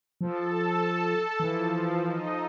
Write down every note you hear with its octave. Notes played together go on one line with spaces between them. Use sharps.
F3 A4 A5
E3 F3
D#4 D#5